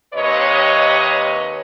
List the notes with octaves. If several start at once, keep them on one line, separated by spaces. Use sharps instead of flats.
D#2 C3 B4 C#5 D#5